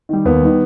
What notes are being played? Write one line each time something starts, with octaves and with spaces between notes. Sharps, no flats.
D#3 G3
D#2 B3
D#3 G3